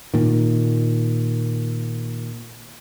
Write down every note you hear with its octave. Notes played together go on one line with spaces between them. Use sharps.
A#2 D#3